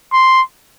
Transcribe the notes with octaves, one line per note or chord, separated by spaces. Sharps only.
C6